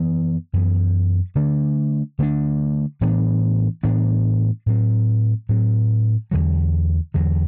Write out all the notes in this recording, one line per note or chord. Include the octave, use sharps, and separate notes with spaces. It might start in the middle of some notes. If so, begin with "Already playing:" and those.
Already playing: F#2 E3 B3
F#2 E3 B3
D3 A3 D4
D3 A3 D4
A2 E3 B3 D4
A2 E3 B3 D4
A2 F#3 C4
A2 F#3 C4
E2 D3 F#3
E2 D3 F#3